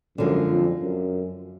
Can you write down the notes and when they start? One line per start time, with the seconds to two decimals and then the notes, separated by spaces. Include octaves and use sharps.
0.18 F#2 D3 F3 G#3
0.50 F2
0.82 F#2